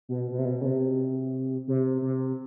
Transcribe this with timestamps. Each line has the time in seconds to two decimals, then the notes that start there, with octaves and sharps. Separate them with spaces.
0.09 B2
0.31 B2
0.39 C3
0.45 B2
0.61 C#3
0.65 C3
1.68 C3
2.02 C3